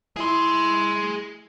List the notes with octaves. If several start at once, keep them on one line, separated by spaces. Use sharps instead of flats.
E4 G#4 C6